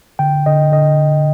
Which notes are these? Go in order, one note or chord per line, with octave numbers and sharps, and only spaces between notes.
D3 G5
D3 D#5
D3 D#5